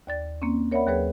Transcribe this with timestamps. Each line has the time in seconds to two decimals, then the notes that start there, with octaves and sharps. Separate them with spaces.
0.07 D#2 D5 A6
0.42 A#3 C4 C#4
0.71 A#4 C#5 D5 E5 F#5 B5
0.87 D#2 F#3 G#4 B4 C#5